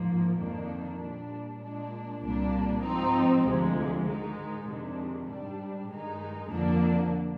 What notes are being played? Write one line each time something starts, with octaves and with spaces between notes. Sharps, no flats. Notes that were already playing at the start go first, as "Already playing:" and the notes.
Already playing: G#2 F3 A#3
F2 D#3 A#3 D4
A#2 G3 D4
A#2 G#3 D4
C2 A#2 G3 A#3 D4
G#2 F3 C4 D#4
D2 C3 F3 G#3
G#2 D#3 G#3 D#4
F2 C3 D#3 G#3 D4
G#2 G3 D4
G2 D#3 G#3 D#4
F2 D3 F3 A#3 D4